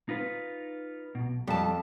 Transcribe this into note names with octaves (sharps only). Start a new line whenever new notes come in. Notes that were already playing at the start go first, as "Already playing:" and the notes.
D#4 F4 B4
B1 B2
F2 G3 A5